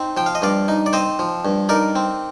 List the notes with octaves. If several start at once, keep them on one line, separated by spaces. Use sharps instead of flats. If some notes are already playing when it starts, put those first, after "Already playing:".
Already playing: C4 D#4
F3 G5
F5
D#5
G2 D5 F5
D#4
D5
C4 C5 D#5
F3
G2
D#4 A#4 D5
C4